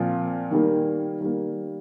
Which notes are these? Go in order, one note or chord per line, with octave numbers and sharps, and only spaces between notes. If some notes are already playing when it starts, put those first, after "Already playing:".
Already playing: A#2 F3 C4 F4
D#3 G3 A#3
D#3 G3 A#3